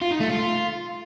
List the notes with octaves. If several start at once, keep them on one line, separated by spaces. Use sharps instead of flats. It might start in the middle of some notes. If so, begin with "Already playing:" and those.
F4
D#4
A3
F4